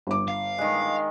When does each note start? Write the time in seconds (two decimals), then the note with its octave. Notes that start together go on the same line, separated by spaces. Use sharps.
0.07 G1 D6
0.28 F5
0.58 D#3 G#3